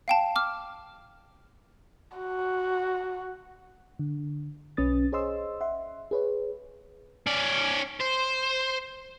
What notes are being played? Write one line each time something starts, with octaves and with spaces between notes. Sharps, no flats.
F5 G5 A5
D6 F6
F#4
D3
B1 C#4 B4 D#6 A6
G#4 C5 C#5 D#5 C6 E6
E5 F#5 C6
G#4 B4 C#5
C#4 D5
C5